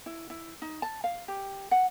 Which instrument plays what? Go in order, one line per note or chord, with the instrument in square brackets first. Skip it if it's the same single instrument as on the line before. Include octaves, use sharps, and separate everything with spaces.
[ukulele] E4
E4
D#4
A5
F5
G4
F#5